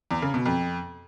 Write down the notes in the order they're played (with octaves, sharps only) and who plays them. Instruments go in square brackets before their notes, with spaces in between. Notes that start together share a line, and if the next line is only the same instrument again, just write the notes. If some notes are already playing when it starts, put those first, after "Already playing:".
[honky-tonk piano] E2
C#3
B2
F2